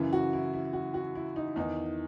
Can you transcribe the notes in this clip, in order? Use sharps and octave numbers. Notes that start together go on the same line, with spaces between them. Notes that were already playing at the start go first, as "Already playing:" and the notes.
Already playing: F#2 C#3 E3
F#4
E4
E4
F#4
F#4
E4
D#4
E2 D#3 D#4